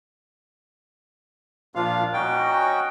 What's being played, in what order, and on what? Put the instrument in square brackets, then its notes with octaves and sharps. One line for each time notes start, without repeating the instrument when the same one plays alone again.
[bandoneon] A#2 F3 F5 [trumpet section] D4 F4
[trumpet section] C#4 D#4 F#4 [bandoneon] G5